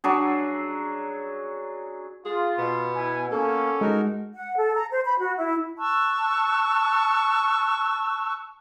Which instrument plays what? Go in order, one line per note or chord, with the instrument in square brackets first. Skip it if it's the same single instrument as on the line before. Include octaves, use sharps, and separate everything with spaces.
[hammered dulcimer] F#3 D4 G#4
[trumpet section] F4 [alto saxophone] G#4
[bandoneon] B2 [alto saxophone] B3
[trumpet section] E4 G#5
[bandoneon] A#3 [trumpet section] B3 C#4 [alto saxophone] A4
[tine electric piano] G#3 [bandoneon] D#4 F#4 A#4
[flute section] F#5
A4
A#5
C5
B5
F#4
E4
A5 C#6 E6 F#6